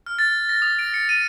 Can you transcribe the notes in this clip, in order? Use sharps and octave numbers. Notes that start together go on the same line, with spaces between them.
F6
A6
A#6
D#6
D7
C#7
D#7